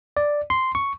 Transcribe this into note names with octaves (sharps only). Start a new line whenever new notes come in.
D5
C6
C#6